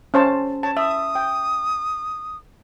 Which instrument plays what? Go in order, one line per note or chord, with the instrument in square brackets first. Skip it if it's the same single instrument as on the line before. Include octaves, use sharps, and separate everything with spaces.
[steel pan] C#4 C5 A5
[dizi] C#5 [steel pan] A5
[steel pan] E5 [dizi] D#6
[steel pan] G5